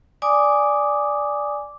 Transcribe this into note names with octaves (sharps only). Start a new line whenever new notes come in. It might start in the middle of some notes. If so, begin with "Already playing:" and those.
D5 G#5 D6 D#6